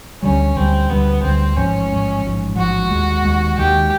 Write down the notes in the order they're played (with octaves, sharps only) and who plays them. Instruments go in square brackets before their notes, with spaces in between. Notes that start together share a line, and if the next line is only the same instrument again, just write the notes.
[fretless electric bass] D2 D3 G3 [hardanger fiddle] C#4
[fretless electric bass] D2 D3 G3 [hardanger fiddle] C4
[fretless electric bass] D2 D3 G3 [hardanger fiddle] B3
[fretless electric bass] D2 D3 G3 [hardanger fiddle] C4
[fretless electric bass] A1 G#2 F3 [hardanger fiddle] C#4
[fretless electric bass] A1 G#2 F3
A1 G#2 F3
[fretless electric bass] A1 G#2 F3 [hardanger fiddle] F#4
[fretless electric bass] D#2 D#3 G#3
D#2 D#3 G#3
[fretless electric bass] D#2 D#3 G#3 [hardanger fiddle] G4